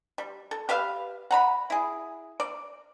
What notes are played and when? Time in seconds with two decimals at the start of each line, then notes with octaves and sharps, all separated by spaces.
0.18 G3
0.51 A4
0.69 G4 B4 E5 F5
1.31 F#5 A#5 B5
1.70 E4 G#4
2.40 D5